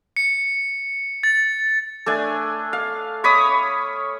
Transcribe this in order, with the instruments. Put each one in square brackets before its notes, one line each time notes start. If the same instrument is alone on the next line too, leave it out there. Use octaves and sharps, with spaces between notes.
[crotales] C#7
A6
[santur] A3 D4 G#5
F5
C#5 B5 D6 D#6